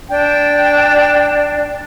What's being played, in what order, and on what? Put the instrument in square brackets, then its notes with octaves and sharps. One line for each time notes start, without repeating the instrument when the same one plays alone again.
[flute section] D4 G5